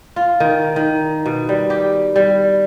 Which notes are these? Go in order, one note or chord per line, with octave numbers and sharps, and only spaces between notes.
F4
D#3
D#3
B2
G3
G4
G3